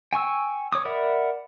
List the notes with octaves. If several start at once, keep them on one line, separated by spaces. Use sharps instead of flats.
G5 G#5 C#6 E6
C#5 D6 D#6
A#4 D5 E5 F#5 B5